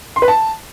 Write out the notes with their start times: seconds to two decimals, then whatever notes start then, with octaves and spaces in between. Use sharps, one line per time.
0.16 C6
0.22 B4
0.28 A5